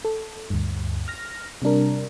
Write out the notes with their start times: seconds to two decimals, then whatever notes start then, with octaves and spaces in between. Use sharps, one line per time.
0.05 A4
0.50 D2 G2
1.08 F6 A#6
1.62 C3 G3 D4 A#4